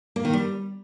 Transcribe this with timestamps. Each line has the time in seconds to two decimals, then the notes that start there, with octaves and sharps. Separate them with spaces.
0.16 A#3
0.25 D#3
0.33 G3